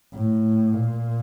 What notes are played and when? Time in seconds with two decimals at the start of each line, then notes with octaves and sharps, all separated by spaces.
0.14 A2
0.73 A#2